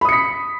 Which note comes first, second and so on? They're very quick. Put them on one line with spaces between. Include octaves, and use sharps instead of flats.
B5 D#6 C#7 B6